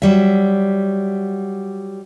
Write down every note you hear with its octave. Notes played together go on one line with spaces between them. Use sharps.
F#3 G3 E5